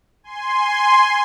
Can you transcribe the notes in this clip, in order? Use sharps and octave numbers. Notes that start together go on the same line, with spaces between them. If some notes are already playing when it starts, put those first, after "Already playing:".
G#5 C6